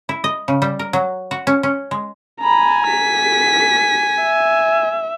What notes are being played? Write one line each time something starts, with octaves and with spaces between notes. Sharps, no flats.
E4
D#5
C#3
G3
A#4
F#3
F#4
C#4
C#4
G#3
G#5 A#5 B5
B6
E5